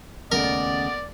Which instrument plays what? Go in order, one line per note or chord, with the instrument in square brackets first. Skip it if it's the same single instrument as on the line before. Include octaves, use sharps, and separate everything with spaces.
[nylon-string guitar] D#2 C#3 A3 [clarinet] B3 [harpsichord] A#4 [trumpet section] D5